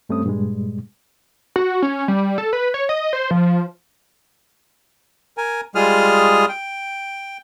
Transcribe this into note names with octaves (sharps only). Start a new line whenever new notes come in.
G2 G3 A3 C4 C#4 D#6
G2 A#2 G3 G#3
F#4
C#4
G3
A4
B4
C#5
D#5
C5
F3
A#4 G#5
G3 G#3 F4 G#4 D#6 F6
G5